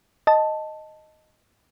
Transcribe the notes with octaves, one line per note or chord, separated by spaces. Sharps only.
D#5 A5